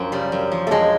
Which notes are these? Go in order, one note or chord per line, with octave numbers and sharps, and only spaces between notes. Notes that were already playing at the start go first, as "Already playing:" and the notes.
Already playing: F#2 F3
C#3 G3
F#2
F3
A3
F#2 G#3